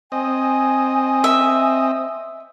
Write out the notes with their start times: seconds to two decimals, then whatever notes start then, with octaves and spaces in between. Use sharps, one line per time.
0.12 C4 D#5 G#5
1.24 E5